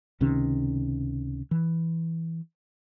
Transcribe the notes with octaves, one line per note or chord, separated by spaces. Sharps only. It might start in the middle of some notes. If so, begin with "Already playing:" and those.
C#2 C3 D#3 C#4
E3